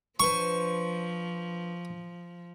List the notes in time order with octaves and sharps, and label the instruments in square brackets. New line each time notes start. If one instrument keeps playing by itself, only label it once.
[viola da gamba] F3 [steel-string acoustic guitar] D4 B4 C5 [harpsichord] C#6